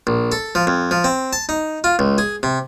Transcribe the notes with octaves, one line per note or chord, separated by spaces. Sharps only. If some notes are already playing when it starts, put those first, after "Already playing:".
A#1
A4
F3
F2
F3
C4
A5
D#4
F4
C#2
G#4
C3